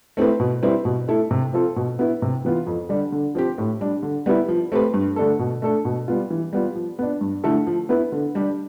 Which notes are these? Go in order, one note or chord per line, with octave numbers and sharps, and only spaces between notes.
A3 C4 E4 B4
B2
G3 C4 E4 B4
B2
A3 E4 A4
C3
F3 C4 F4 A4
B2
B3 E4 B4
C3
E3 B3 F4
F2
D3 G3 D4 G4
D3
F3 C4 G4
A2
G3 D4
D3
G3 B3 E4 B4
F3
A3 C4 G4 B4
G2
D3 A3 D4 A4
B2
A3 D4 A4
B2
G3 B3 F4
E3
G3 B3 F4
F3
B3 D4
G2
D3 A3 E4 A4
F3
B3 E4 B4
D3
G3 D4 G4